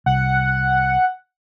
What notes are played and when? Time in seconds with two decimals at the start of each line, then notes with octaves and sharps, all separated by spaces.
0.06 C2 F#5